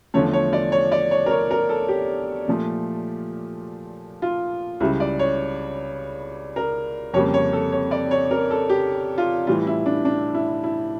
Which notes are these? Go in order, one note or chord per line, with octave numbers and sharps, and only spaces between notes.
E2 D3 F3 A3 C#5
C#5
D5
C#5
D5
C#5
A#4
C#5
A#4
A4
G4
A#2 F3 A3
F4
C#2 C#3 G3 E4
D5
C#5
A#4
F2 C#3 G3 A#3 C#5
C#5
A4
C#5
D5
C#5
A#4
A4
G4
F4
A2 E3 G3 F4
E4
D4
D4
E4
E4